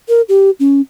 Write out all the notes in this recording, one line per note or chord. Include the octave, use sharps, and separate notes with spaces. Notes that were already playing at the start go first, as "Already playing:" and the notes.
A#4
G4
C#4